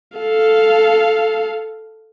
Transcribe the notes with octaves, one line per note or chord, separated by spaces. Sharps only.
A4 F5